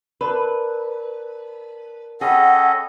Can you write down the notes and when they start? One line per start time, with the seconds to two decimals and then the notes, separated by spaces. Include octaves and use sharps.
0.21 A#4 B4 D5 A5
2.21 C#4 G#4 A4 D#5 F#5 G5 B5